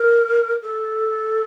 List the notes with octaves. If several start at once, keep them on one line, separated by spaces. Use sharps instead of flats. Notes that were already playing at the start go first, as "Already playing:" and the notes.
Already playing: A#4
A4